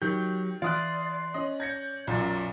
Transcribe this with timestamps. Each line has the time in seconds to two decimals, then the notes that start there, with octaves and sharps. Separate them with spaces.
0.02 D#3 F#3 G4
0.62 E3 D5 F5 C6 D#6 F#6
1.34 C#4 D#5
1.60 G6 G#6 A#6 C#7
2.07 B1 F#2 F4 D5